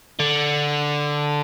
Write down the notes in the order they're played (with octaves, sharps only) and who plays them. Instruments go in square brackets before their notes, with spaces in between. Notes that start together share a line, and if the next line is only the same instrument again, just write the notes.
[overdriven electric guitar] D3